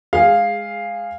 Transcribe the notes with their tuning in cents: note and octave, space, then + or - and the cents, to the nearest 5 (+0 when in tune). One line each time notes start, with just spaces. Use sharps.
G#3 +0 G#4 -15 F5 +0